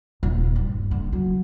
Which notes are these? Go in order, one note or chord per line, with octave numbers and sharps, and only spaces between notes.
D#1
G2
D3
F#3